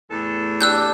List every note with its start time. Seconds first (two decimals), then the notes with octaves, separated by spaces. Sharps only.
0.09 E2 A2 A4
0.61 D4 G4 E6 F#6 G6